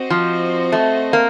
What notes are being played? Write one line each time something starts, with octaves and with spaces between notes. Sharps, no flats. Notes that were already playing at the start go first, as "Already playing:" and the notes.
Already playing: C4 F#4 C5 D#5
F3
A3
A#3